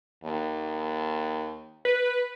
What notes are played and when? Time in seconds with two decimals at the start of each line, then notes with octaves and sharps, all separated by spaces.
0.24 D#2
1.85 B4